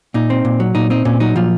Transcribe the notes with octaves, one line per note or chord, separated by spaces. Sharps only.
A#2 D#4
C4
A#2
F#3
A#2 D#4
C4 D#4
A#2 C#4
F#3 D#4
A#2 F3 F4